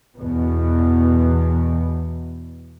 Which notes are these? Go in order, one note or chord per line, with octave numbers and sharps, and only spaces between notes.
E2 B2